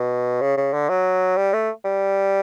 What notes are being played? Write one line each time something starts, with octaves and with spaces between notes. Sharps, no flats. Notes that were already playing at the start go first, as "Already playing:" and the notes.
Already playing: B2
C#3
C#3
D3
F#3
G3
A3
G3